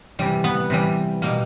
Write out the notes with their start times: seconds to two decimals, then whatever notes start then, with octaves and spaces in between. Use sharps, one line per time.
0.19 C3 E3 G3
0.44 B3
0.70 C3 E3 G3
1.22 B2 G3 A#3